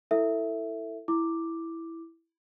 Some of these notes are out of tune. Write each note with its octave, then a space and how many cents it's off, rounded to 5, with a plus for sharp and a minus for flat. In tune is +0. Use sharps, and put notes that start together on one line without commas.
E4 +0 A4 +20 E5 +0
E4 +0 D6 +0